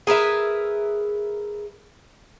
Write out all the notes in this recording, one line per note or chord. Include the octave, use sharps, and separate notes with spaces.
G#4 A#4 B4 E5